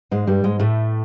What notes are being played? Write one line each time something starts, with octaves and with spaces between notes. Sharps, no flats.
G#2 G#3
G2 G3
G#2 G#3
A2 A3